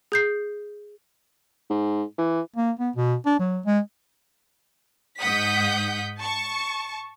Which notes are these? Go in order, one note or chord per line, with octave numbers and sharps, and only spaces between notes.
G#4 G6 C7
G#2
E3
A#3
B3
B2
D4
F#3
G#3
G#2 F#5 D#6 G6 B6
A5 C#6